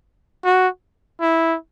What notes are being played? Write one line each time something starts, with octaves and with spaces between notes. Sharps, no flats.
F#4
E4